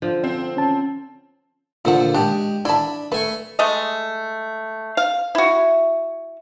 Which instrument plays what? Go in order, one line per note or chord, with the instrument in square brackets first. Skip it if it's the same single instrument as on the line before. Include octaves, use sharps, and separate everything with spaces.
[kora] D3 F3
[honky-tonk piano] C4
[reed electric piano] C#4 A5
[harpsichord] A#2 D3 F3 [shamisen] A3 F#5
[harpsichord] G#3 G4 [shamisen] D4
[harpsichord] D4 B5 [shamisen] E4 A5
[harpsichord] A3 G#5 C#6 [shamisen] B4
[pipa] G#3 A3 D#5
F5
E4 F#4